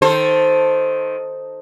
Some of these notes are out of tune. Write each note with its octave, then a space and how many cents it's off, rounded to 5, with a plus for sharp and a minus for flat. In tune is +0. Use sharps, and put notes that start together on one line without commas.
D#3 +5 A4 +0 C5 +0